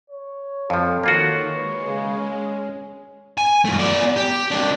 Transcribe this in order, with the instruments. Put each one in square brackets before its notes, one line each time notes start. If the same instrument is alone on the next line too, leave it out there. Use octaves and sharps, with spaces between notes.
[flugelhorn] C#5
[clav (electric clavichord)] F2 F3 [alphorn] A4
[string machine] D#3 [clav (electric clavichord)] A#3 F4 F#4 [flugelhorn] C#5
[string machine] G#3 [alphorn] B4
[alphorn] C#3
C#4
[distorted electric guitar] G#5
F#2 A3
B3 D5
G4
C2 D4